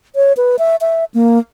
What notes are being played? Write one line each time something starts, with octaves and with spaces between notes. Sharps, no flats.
C#5
B4
E5
E5
A#3